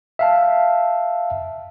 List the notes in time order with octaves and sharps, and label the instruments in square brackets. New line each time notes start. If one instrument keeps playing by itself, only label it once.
[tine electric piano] E5 F5 A5